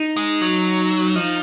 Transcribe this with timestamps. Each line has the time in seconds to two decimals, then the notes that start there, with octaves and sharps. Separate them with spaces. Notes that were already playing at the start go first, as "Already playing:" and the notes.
Already playing: D#4
0.17 G#3
0.41 F#3
1.16 F3 D#4